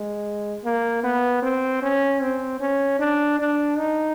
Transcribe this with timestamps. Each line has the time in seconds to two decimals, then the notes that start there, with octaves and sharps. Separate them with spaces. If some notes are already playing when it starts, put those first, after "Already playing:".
Already playing: G#3
0.65 A#3
1.03 B3
1.42 C4
1.82 C#4
2.21 C4
2.60 C#4
2.99 D4
3.39 D4
3.78 D#4